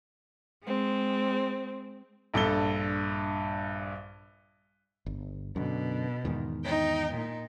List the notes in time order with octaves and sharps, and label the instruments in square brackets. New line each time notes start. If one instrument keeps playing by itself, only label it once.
[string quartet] G#3 C4
[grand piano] A#1 G2 A4 G7
[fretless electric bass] G1
[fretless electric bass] F#2 D3 [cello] B2
[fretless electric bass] E2 G#2 D#3
[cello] D#4 G5
A#2 D#4